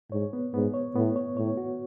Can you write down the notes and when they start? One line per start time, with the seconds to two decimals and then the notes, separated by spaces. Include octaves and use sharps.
0.12 G#2 C#5
0.33 B3
0.54 G#2 B3
0.74 C#5
0.96 A2 B3
1.16 C#5
1.37 A2 C#5
1.57 F#4